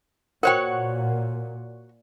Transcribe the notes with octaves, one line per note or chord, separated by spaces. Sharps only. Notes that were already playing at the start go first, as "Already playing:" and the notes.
A#2 F#4 A#4 C5 C#5 F#5 G5